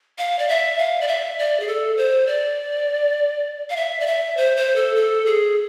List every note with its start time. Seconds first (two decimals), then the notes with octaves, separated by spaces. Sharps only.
0.18 F5
0.39 D5
0.49 E5
0.78 F5
1.01 D5
1.08 E5
1.38 D5
1.60 G#4
1.68 A4
1.97 C5
2.27 D5
3.70 F5
3.76 E5
4.00 D5
4.07 E5
4.37 C5
4.57 C5
4.76 A4
4.96 A4
5.26 G#4